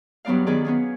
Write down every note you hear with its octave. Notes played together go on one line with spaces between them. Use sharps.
G2 F#3 B3 D#4 D5 F5
D#3 B3 G#4 D5
B3 C#4 G#4